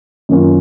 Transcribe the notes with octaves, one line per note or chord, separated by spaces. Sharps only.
F#2 D#3 A#3 C#4 F4